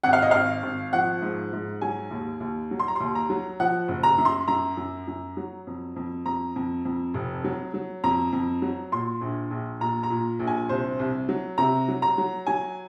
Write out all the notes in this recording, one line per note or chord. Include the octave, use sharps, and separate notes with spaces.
G#1 F#5
F5
D#5
G#1 F5
G#1
F3 F#5
G#2
G#2
F#3 G#5
D#2
D#2
F#3
C6
A#5
D#2 C6
A#5
F#3
F3 F#5
F#1
A#5
F#2
C6
F#2 A#5
F#2
F#2
F#3
F2
F2
F2 A#5
F2
F2
F1
F#3
F#3
F2 A#5
F2
F#3
A#2 C6
A#1
A#1
A#2 A#5
A#5
A#2
A#1
G#5
C2 C5
C2
F#3
C3 A#5
F#3
A#5
F#3
F#3 G#5